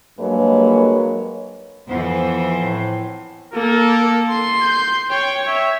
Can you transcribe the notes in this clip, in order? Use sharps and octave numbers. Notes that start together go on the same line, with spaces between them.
G2 F#3 G#3 A#3 B4 C#5
F2 E3 B3 C5
A2
A#3 A4 A#4
C6 C7
G6
C#5 G5
E5